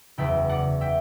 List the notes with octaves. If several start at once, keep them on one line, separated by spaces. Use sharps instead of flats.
F#1 E2 C#3 E5 G5
D5 F#5
E5 G5